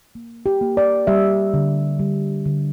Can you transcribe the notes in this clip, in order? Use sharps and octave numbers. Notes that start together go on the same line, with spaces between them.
A#3
G4
A#3
D5
G3 E5
D3
G3
D3